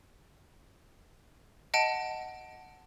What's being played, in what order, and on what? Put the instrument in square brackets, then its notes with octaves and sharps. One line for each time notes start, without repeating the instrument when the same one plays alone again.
[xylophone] D#5 F#5 A5 D7